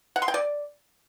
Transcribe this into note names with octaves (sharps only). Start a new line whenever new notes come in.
F#5
C6
G5
D5